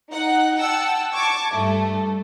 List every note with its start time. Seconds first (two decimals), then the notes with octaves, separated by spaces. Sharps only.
0.10 D#4 F#5
0.56 F#5 G5 A5 E6
1.14 A5 C#6 D6 G#6
1.53 G2 A3